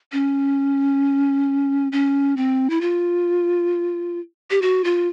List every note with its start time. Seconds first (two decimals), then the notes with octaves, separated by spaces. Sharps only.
0.12 C#4
1.92 C#4
2.37 C4
2.70 E4
2.81 F4
4.51 G4
4.62 F#4
4.84 F4